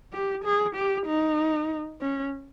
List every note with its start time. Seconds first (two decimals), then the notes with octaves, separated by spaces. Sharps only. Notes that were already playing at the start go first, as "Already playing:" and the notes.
0.13 G4
0.44 G#4
0.76 G4
1.06 D#4
2.01 C#4